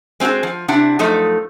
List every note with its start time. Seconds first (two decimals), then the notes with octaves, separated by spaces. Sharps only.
0.20 G#3 C4 F4 F#4 G#4
0.43 F3
0.68 C3 D4 E4 F#5
0.99 F#2 F3 A3 D#4 A4